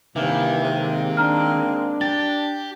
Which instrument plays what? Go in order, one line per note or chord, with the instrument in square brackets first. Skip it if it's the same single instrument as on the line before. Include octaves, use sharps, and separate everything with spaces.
[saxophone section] G2 E3 A#3 [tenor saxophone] C3 [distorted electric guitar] D#3
[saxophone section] G#3 A#3 C4
[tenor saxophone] D4 [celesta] A#5 F6
[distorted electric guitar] G4 [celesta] A6